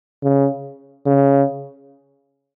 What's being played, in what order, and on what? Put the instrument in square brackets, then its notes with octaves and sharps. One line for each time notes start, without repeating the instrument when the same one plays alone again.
[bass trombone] C#3
C#3